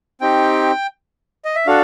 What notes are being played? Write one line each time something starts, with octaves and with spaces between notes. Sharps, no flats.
C4 D#4 G4 G5
D#5
E5
D4 F#4 A4 F5